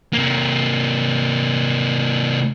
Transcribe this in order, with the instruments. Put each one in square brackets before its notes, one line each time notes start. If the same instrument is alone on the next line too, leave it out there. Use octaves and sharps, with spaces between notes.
[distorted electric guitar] C3 A#3